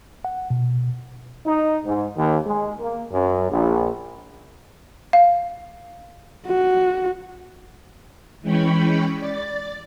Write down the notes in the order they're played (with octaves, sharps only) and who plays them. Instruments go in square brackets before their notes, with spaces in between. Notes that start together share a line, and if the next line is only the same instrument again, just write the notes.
[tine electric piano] F#5
B2
[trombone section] D#4
G#2
D#2
G#3
A#3
F#2
A#1
[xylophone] F5
[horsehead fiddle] F#4
[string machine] E3 G#3 C#4 G5 B5 C#6
D5 A6